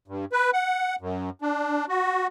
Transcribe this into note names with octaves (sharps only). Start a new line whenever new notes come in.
G2
B4
F#5
F#2
D4
F#4